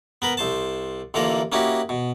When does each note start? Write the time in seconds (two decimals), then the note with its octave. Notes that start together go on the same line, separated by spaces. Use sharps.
0.22 B3 A#4 B4
0.37 C2 C5 A5
1.14 A1 D3 E3 A#3 F4 A#4
1.52 A#3 C#4 D#4 E4 F#4 G4
1.89 B2